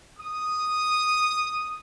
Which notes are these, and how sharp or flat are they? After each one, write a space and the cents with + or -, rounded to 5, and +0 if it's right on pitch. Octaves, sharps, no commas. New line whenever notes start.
D#6 -5